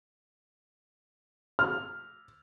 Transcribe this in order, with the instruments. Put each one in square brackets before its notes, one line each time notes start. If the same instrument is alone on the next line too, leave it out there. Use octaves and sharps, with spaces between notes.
[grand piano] F6